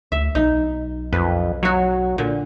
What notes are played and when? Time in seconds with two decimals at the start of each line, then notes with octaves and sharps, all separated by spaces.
0.12 D2 E5
0.35 B1 D#4
1.13 F2 B4
1.63 F#3 F#4 C#5
2.18 A#2 D3